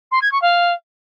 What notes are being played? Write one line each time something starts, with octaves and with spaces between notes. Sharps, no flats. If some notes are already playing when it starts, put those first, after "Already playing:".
C6
G#6
C#6
F5